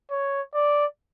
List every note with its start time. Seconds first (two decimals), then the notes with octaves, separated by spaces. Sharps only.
0.11 C#5
0.55 D5